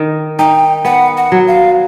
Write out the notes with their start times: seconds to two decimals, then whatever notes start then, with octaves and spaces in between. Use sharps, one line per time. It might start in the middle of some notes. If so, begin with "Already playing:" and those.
Already playing: D#3
0.39 D#4 G5
0.85 B3 F#5
1.17 F#5
1.32 F#3
1.48 F5